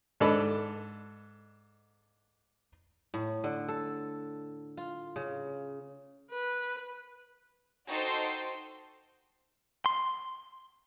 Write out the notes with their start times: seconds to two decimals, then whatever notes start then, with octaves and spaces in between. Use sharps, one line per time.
0.20 G#2 D4 A4 D#5 B5
3.14 A2
3.44 D3
3.68 A4
4.77 F4
5.16 C#3
6.31 B4
7.86 D#4 F#4 A4 C5 G5 C6
9.86 C6